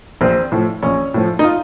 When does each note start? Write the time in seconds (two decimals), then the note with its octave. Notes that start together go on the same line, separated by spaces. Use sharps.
0.21 A#1 C4
0.52 A2 F3
0.83 A#1 C#4
1.14 A2 F3
1.39 D#4
1.44 F4